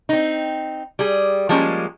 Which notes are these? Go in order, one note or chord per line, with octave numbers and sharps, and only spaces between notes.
C4 D#4
G3 G#4
F3 G3 G#3 A#3 C#4